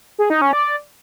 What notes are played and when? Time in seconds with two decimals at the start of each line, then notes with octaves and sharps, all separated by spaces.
0.19 G#4
0.30 D#4
0.42 C#4
0.53 D5